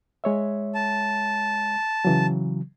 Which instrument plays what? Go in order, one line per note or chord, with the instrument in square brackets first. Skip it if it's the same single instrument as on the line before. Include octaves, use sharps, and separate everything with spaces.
[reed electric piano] G#3 C#5 E5
[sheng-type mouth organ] A5
[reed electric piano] C#3 E3 F#3